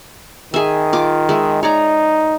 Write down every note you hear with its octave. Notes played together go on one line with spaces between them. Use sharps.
D#3 G#4 E5
F4 D6
G#3 E5
D#4 C#5 D5 A#5